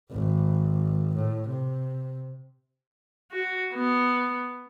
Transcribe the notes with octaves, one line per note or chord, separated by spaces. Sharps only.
G#1
A2
C3
F#4
B3